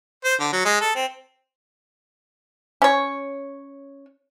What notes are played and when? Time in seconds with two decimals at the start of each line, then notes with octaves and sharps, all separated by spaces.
0.24 C5
0.40 D3
0.53 F#3
0.65 G#3
0.81 A4
0.95 C4
2.82 C#4 C#5